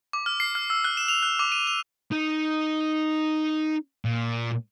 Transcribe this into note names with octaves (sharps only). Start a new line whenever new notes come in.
D6
F6
C7
F6
E6
F#6
E7
F7
F#6
D6
D#7
F7
D#4
A#2